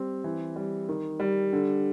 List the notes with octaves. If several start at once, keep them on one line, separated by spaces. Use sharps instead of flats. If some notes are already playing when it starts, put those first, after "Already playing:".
Already playing: G3 C4
E3
G3
D#3
G3
D3